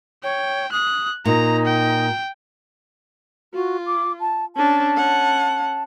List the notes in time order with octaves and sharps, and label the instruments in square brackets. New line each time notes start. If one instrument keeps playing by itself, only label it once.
[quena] C#5 [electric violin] G5
[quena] D#6 [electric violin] F#6
[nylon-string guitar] A#2 [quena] D#4 [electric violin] A#5
[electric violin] G5
[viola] F4 [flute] F#4
[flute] D6
A5
[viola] C#4 D4 [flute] A5
[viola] C#4 F#5